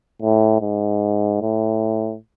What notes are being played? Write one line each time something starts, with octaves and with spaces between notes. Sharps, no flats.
A2
G#2
A2